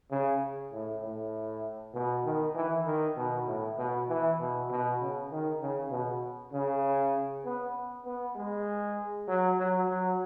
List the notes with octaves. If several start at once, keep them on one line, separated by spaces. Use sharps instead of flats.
C#3
A2
A2
B2
D#3
E3
D#3
B2
A2
B2
E3
B2
B2
C#3
D#3
C#3
B2
C#3
B3
B3
G#3
F#3
F#3
F#3